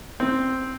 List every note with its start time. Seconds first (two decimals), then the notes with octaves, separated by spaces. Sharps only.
0.20 C4